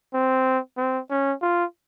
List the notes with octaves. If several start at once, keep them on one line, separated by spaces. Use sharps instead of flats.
C4
C4
C#4
F4